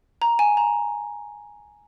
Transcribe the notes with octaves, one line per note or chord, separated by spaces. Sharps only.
A#5
G#5
A#5